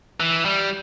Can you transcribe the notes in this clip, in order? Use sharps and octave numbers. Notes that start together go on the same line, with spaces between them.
E3
G3